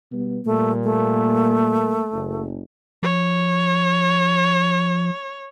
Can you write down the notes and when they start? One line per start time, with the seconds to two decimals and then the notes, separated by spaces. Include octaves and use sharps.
0.11 B2 G3 B3
0.45 A#2 G3 A3 A#3
0.84 A3
2.11 F#1
3.03 F3 C#5